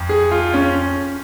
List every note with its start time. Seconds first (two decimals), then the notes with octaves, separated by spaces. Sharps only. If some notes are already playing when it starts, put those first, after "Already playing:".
Already playing: F2
0.09 G#4
0.31 F4
0.54 C#4